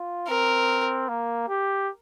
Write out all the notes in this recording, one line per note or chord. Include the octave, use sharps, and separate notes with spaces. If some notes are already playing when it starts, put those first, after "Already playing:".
Already playing: F4
C4 A#4
A#3
G4